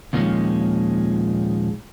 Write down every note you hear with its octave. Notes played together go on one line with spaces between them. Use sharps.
D#2 A#2 D#3 F3 G#3 C#4